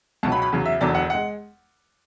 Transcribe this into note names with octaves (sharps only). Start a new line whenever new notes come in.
C#2 B2 F#3 A5
B5
B5
E2 C#3 F#3
E5
E1 E2 D3 F#3 D5
F#5
G#3 F#5